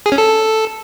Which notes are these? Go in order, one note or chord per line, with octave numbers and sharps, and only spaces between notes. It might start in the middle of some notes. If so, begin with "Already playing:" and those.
G#4
C#4
A4